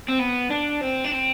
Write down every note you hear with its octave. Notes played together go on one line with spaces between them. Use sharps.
C4
B3
D4
C4
D4
C4